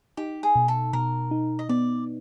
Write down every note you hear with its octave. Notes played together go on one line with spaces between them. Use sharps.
D#4 G4
G#4
B2
A4
B2 A#4
D#4
D#5
B3 D5